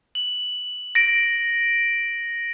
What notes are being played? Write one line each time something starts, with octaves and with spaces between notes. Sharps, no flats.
F#7
A#6 D7